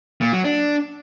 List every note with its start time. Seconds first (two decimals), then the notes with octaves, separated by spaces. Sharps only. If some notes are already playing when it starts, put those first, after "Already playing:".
0.21 A#2
0.33 F#3
0.45 D4